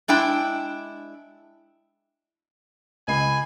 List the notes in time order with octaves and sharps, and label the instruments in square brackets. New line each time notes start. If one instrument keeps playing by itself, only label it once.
[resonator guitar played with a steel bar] G#3 D4 E4 G5
[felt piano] C#2 D#5 C7 [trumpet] G#5 [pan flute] B5